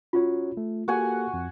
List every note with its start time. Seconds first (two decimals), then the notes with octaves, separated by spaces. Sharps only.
0.13 C#4 F4 F#4 C#5
0.57 A3
0.88 A#3 F#4 G4 A4 F#5 G#5
1.34 F2